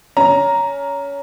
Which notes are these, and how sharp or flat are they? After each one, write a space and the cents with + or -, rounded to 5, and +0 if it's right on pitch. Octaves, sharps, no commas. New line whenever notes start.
C#4 +20 A#5 +0